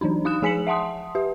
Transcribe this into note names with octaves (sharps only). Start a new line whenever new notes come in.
E3 F#3 D4 D#4
D#4 F5 D#6 F#6 E7
F3 G#4 G#5 B6 C#7 F#7
E5 F#5 A5 C6 D#6
G4 B4 E5